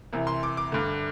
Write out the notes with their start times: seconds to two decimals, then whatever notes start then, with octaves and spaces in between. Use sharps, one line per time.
0.13 C2 C3 E3
0.27 C6
0.43 D6
0.57 D6
0.72 G2 D3